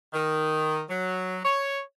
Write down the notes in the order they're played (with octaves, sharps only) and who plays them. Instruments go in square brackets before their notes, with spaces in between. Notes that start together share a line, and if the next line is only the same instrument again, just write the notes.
[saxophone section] D#3
F#3
C#5